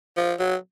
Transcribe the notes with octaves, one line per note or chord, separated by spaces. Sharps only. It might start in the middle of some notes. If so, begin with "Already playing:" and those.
F3
F#3